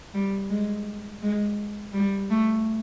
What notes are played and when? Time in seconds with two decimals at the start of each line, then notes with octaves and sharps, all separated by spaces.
0.14 G3
0.49 G#3
1.22 G#3
1.93 G3
2.30 A3